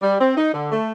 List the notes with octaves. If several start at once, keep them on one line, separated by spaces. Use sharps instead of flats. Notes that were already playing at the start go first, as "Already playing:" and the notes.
G3
C4
D#4
D3
A3